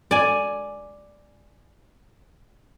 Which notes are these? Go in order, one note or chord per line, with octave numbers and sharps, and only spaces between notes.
D5 G#5